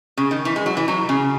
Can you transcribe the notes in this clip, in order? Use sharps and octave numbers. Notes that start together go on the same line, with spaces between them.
C#3
D#3
E3
G#3
F#3
E3
F#3
C#3